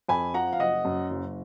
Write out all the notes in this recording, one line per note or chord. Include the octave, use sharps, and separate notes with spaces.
F2 G#5 B5
F3 F#5 A#5
F5
F#1 D#5 F#5
F#2
F#1